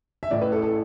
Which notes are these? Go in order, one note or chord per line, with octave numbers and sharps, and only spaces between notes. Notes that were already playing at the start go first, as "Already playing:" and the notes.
E5
A1 A2 E3 D5
B4
A4
A4